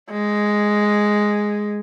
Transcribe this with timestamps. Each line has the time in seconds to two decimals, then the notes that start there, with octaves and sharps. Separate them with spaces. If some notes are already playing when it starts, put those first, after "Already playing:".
0.11 G#3